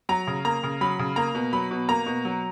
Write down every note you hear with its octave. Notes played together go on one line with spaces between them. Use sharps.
F#3 A#5
C#3
A#3 A#5
C#3
F#3 B5
C#3
A#3 A#5
B2
F#3 B5
B2
A#3 A#5
B2
F#3